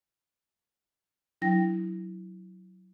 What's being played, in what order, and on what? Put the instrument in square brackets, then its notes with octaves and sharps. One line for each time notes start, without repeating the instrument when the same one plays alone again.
[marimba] F#3 D4 E4 G5 A#6